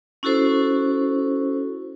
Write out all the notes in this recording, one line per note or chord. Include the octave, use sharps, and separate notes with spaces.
C#4 E4 F#4 A4 C5